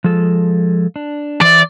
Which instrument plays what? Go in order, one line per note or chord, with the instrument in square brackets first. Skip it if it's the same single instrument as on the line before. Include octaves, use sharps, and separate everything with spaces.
[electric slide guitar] F3 G#3 A4
D4
[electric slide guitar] E3 C5 E5 [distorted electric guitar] D5